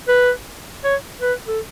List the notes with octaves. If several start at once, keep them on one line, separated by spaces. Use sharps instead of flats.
B4
C#5
B4
A4